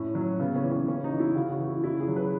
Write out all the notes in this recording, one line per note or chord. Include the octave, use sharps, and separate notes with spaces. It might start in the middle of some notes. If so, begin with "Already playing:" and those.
Already playing: A2 C#4
F#3
C#3 B3
C#4
E3
C#4
C#3 C#4
D#4
E3
E4
C#3 F#4
F#4
E3
E4
C#3 E4
G#4
F#3
B4